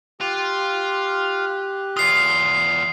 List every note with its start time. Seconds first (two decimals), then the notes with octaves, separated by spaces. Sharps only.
0.21 F4 G4 F#6
1.97 E2 F4 D#6 C7